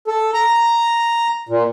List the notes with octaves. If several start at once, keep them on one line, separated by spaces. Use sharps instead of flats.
A4
A#5
A#2